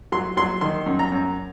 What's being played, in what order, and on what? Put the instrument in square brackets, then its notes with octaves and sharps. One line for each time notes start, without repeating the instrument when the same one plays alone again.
[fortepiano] F#3 C6
F#3 C6
D#3 C6
F#2
A#5
F#2